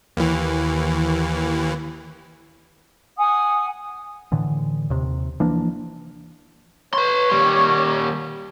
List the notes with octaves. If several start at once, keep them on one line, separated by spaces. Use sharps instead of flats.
D#2 E3
F#5 G#5 D#6
A2 D3 E3
D#2 C3
E3 F3 A#3 D4
B4 C#5 C6
D#2 G3